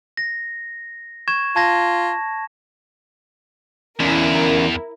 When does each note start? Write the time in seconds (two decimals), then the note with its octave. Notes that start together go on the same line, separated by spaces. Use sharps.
0.17 A#6
1.28 C#6 G#6 E7
1.56 F4 A5 G#6 A#6
4.00 E2 E3 C#4 E4 A#4 D5